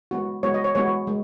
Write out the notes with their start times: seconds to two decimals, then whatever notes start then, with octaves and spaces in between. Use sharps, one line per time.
0.11 G#3 B3 F#4
0.43 G#3 B3 F#4 C#5
0.54 D#5
0.64 C#5
0.75 G#3 B3 F#4 C#5
1.07 G#3